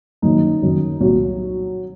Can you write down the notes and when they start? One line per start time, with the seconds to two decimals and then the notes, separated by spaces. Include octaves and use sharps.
0.22 F#1 F#2 D#3 D#4
0.62 F#1 F#2 D#3
1.00 C2 A#2 F#3